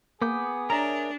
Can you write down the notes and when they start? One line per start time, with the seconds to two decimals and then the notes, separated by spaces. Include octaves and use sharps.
0.22 A#3 B3 G#4 D6 G6
0.70 D4 A#4 C#5 E5 A#5